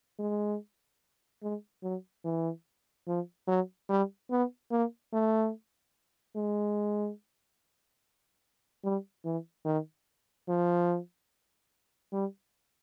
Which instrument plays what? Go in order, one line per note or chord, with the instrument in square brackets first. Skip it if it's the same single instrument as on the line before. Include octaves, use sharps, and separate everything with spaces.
[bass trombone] G#3
G#3
F#3
E3
F3
F#3
G3
B3
A#3
A3
G#3
G3
E3
D#3
F3
G3